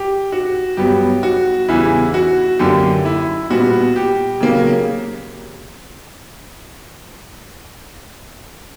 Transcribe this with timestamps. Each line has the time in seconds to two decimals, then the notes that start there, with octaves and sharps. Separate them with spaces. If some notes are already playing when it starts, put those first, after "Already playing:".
Already playing: G4
0.32 F#4
0.77 G2 F#3 B3 G4
1.23 F#4
1.68 E2 C#3 E3 G3 E4
2.14 F#4
2.59 F#2 D3 A#3 G4
3.05 E4
3.50 A#2 G3 B3 F#4
3.96 G4
4.40 C#3 F#3 A#3